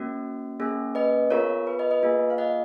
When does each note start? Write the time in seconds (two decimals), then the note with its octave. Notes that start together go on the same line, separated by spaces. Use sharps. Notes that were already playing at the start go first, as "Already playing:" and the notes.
Already playing: A#3 C#4 F#4
0.60 A#3 C#4 G#4
0.95 B4 D#5
1.30 B3 F4 G#4 A#4 C#5
1.67 B4
1.79 B4 D#5
1.91 B4 D#5
2.03 A#3 F4 G#4
2.30 F5
2.38 D#5 F#5